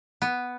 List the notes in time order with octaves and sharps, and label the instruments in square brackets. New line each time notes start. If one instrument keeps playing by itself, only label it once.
[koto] B3